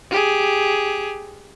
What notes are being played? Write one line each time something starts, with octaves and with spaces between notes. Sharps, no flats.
G4 G#4